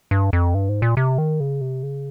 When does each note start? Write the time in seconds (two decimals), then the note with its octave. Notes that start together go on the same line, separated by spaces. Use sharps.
0.11 G2
0.33 F2
0.54 G2
0.69 G#2
0.82 A#2
0.97 C3
1.18 D#3
1.40 C#3
1.61 C3
1.83 C#3